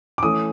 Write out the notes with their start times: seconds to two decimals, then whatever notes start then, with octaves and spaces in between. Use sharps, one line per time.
0.18 D6
0.22 E3 A3 C#4 D#6